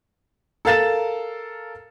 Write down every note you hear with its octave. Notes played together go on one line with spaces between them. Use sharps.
A4 A#4 F5 A6 E7